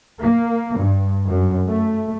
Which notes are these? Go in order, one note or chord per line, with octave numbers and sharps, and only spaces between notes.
A#3
G2
F#2
A3